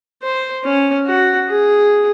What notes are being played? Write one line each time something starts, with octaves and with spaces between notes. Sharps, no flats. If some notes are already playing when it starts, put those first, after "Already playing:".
C5
C#4
F#4
G#4